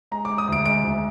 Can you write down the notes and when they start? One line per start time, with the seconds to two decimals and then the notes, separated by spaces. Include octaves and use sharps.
0.11 G#3 A#5
0.25 D6
0.30 G#3
0.38 D#6
0.48 D2 D7
0.66 G#3 D7
0.83 D2